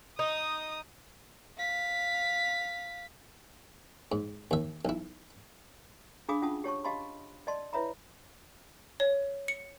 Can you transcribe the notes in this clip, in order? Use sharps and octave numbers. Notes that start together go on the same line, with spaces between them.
D#4 D#6
F5 B6
G#2
D#2 E5
B1 E4
D4 G#4 F5 B5 D6 D#6
C#4 F4 F#5 A5 D#6
G4 C#5 A5 C#6
G4 D#5 F5 A5 B5 C6
D5 D#5 A5 C6
E4 B4 C#5 E5 A#5 B5
C#5
C#7